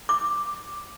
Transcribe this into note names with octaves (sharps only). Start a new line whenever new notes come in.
D6